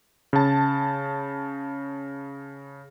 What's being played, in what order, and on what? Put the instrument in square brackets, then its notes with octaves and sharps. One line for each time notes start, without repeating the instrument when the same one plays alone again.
[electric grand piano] C#3 A5